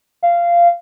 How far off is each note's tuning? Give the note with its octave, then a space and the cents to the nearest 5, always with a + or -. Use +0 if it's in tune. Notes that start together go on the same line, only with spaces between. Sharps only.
F5 -15